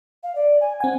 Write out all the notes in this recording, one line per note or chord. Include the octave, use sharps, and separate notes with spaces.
F5
D5
G#5
C4 F#5 G#5